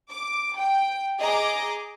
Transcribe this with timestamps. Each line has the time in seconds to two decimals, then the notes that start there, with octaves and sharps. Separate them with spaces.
0.11 D6
0.58 G5
1.20 G#4 D#5 A#5 D6